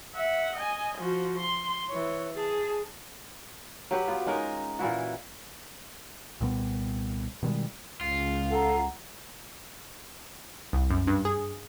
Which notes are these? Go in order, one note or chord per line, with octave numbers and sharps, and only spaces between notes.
E5 F#5
D#5 G#5
F3 F#4
C6
E3 C#5
G#4 A5
F#3 G4 B4
B3 F4
G#3 C#4 D#4 A#4
A#2 E3 E4 F#4
C2 A#2 G3 B3
B2 D#3 G3 G#3
C#2 F4
A4 F#5 A#5
C2
F#2
G2
G#4